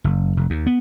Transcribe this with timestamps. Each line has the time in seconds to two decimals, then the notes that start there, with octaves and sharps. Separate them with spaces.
0.04 F#1
0.37 F1
0.50 D#2
0.67 B3